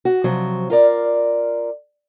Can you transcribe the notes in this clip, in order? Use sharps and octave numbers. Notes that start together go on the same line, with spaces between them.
F#4
C3 F3 F#3
F4 A#4 D5